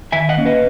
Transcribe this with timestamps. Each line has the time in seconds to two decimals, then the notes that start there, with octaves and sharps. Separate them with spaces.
0.12 D#3 E5 G#5
0.29 D#5 F#5
0.37 A#3 C#4
0.46 B4 D#5